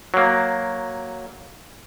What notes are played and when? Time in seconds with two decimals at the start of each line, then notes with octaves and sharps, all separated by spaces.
0.14 F#3 A#3